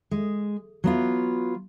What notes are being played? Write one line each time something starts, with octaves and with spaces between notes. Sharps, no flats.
G#3
F#3 B3 F4